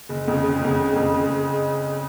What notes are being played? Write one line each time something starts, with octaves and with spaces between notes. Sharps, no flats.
F#1
F2 C#3
F#1
F2 C#3
F#1
F2 C#3
F#1